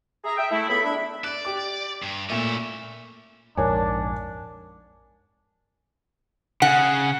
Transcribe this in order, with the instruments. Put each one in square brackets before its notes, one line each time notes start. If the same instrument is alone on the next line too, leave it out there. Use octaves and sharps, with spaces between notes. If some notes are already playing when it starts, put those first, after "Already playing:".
[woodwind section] G#4 E5 A#5
E5 G5
A3 E4
C#2 B3 A4 E5 B5
D4 E5 B5
[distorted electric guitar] D5 [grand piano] F#6
[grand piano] G4 D6
[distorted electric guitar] G2
[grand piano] A#2 A3 [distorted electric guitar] C#4 E4
[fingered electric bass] A#1 F2 G#2 [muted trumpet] D4 [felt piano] A#4 C#5 G#5
[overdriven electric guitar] C#3 [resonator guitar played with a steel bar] F#5